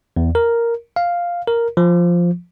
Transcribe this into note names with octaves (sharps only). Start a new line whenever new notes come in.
E2
A#4
F5
A#4
F3